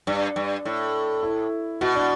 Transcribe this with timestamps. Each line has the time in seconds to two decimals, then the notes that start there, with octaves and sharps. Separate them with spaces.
0.07 G2 D4
0.36 G2
0.65 A2
1.23 E4
1.81 B2 F#4
1.96 D4